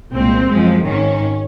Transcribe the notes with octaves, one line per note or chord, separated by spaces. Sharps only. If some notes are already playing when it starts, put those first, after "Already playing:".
C2 A#2 G#3 C4
F#2 F3 G#3
G#1 G#2 D#3 C#4